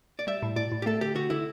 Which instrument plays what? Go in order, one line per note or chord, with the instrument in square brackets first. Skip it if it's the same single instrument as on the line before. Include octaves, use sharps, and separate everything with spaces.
[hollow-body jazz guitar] D5
[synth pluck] G3 [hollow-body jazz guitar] E5
[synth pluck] A2
[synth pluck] A2 [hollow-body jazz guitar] D5
[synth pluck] A2
[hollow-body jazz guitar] G4
[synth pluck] A3 [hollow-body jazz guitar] A4
[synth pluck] D3 [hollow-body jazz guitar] G4
[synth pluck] D3 [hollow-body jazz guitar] F#4
[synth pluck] D3 [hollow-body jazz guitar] E4